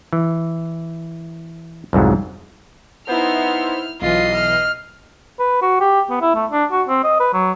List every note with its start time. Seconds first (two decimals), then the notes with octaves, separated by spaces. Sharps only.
0.13 E3
1.93 C2 F2 G#2 F#3
3.08 B3 D#4 E4 C5 F6
4.01 B1 E3 F4 D#5 C7
4.35 F6
5.39 B4
5.62 F#4
5.80 G4
6.10 B3
6.21 E4
6.35 A3
6.52 D4
6.71 F#4
6.88 C4
7.04 D#5
7.20 B4
7.33 F#3